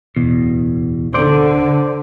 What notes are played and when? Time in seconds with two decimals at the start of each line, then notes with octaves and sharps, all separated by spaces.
0.16 D1 E2 B2
1.14 D3 C5 D5